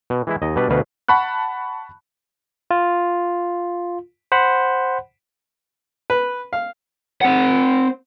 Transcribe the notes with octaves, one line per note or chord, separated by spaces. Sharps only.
B2
E3 G#3 E4
D#2 D#5
B2 G3 D4 B4
D2 B2 B4 F5
F#5 A5 B5 C#6 F#6
F4
C5 F#5 B5
B4
F5
C4 F#5